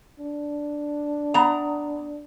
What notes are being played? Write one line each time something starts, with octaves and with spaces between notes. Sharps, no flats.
D4
B3 A#5